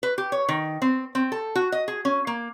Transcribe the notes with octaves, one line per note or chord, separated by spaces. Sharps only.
B4
G4
C#5
D#3
C4
C4
A4
F#4
D#5
G#4
C#4
A#3